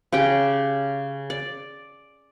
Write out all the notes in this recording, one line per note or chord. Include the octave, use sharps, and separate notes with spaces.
C#3 G4 G5
D5